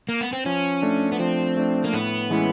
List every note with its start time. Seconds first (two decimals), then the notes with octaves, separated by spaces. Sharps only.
0.09 A#3
0.21 B3
0.33 C4
0.46 F3 C#4
0.82 A3 D4
1.12 B3
1.19 F3 C4
1.57 A3 D4
1.85 A#3
1.93 A2 B3
2.30 E3 G#3 C#4 E4